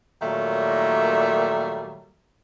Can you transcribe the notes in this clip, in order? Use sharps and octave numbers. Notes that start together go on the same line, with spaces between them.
A#2 D#3 F#3 G3 A3 A#3